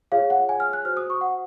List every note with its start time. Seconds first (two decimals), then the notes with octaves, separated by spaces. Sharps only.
0.12 F4 G#4 C#5 F5
0.30 F#5
0.49 G#5
0.60 F6
0.73 F#6
0.85 F#4 C5 F6
0.97 D#6
1.10 C#6
1.21 F#5